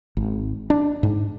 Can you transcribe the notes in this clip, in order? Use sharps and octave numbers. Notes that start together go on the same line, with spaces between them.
G#1
D4
G#2